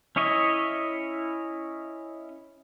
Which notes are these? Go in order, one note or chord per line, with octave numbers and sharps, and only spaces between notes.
C#4 E4 C#5 D#5 E5